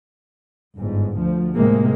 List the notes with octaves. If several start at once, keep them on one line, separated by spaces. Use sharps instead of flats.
G1 G#2
D2 F3
A2 C3 G#3 A#3